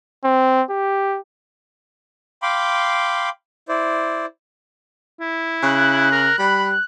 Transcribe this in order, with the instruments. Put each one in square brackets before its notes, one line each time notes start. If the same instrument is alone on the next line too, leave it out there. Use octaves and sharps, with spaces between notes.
[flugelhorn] C4
G4
[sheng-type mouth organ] F5 G5 B5 C6 D6
E4 C5 D5
[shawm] E4
[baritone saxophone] C#3 [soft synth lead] F#6
[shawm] A#4
[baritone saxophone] G3 [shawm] B5